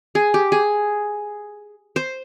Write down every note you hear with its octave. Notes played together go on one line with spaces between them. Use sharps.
G#4
G4
G#4
C5